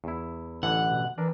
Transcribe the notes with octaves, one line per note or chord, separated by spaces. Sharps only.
E2 E4
A1 D3 E3 F#5
B2
E3 D4 A#4